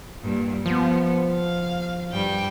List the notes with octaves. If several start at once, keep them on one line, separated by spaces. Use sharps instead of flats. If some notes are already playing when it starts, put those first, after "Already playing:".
G2 A#2
F3 B3
F5
G2 G3 G5